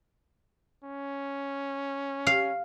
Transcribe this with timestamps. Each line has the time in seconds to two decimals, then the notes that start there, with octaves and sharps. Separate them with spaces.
0.84 C#4
2.27 F5